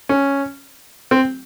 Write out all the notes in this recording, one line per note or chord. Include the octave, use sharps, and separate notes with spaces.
C#4
C4